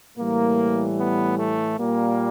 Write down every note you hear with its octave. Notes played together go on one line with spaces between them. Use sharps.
A2 E3 G3 A#3
B3
A3
A#2 G3 A#3